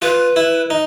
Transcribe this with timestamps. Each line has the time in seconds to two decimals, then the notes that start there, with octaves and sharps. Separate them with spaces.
0.02 F4 B4
0.36 E4
0.70 D#4